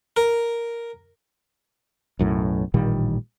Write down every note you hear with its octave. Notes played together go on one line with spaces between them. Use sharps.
A#4
B1 F#2 A2
A1 A#2 D#3 G3